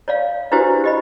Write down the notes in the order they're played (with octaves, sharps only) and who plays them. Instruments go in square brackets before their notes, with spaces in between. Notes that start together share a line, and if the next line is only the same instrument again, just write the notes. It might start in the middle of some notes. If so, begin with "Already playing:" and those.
[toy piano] C#5 D5 F5
D4 E4 F#4 G4 B4 C5
G4 D#5 B5